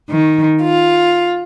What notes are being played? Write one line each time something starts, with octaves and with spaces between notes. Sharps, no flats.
D#3
F4